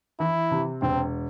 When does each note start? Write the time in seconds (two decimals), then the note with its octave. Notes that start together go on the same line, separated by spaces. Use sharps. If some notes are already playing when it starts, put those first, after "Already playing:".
0.20 E3 E4
0.51 C3
0.82 E1 C4